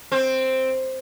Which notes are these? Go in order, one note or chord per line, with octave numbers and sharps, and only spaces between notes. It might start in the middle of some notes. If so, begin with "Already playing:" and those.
C4